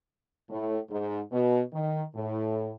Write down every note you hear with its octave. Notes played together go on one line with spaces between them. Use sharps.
A2
G#2
B2
D#3
A2